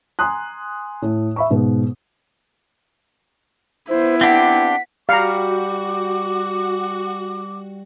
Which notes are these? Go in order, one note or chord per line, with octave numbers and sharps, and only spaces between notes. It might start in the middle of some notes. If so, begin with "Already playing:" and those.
G#5 A#5 C6 D#6 F#6
A2
E5 B5 C#6
G#2 B2 B3
B3 E4 C5
C4 D4 G4 F#5 B6
G3 F#4 F5 G5 A#5 D6 C#7